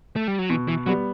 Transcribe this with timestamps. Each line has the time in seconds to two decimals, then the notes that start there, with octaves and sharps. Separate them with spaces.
0.16 A3
0.28 G3
0.39 F#3
0.49 B2 E3
0.68 E3
0.86 F#3 G3 B3